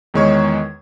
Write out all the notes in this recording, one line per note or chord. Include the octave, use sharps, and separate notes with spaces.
E2 D#3 G#3 C#5 C#6 G#6